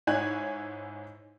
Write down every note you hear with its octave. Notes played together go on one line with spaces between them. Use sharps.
G#2 E4 C#5 G#5 F#6